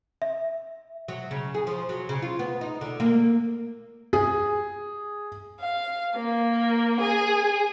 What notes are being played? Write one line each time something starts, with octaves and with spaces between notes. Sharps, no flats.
E5
F#3
C#3
G#4
F3
F#3
C#3
F4
B3
D#4
D3
A#3
G#4
F5
A#3
G#4